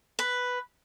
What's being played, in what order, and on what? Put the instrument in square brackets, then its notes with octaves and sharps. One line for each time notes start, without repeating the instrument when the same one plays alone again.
[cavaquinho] B4